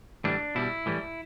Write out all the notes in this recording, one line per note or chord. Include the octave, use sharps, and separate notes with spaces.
A2 E3 G3 D4
B2 G3 E4
A2 E3 G3